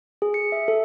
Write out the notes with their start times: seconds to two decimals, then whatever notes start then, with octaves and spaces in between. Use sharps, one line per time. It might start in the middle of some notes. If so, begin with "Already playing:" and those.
0.22 G#4
0.34 C#7
0.52 E5
0.68 A4